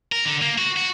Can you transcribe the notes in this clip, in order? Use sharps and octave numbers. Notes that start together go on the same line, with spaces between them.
A#4
D3
A#3
F#4
F#4